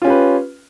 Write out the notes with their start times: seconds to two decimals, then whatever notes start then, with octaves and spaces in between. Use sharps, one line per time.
0.02 F4
0.04 C#4
0.07 G4
0.10 B4